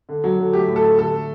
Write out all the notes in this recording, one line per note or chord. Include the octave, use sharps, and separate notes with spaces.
D3
F#3
D3
A3 G4
A2
A4
A3
D3 A4
A3